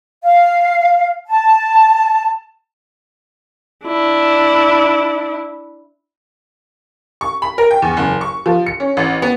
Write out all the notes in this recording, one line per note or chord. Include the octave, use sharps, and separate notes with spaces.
F5
A5
D4 E4
C#6
B5
A#4
G5
E2
F#1
C#6
F3
C#7
C#4
A1
B3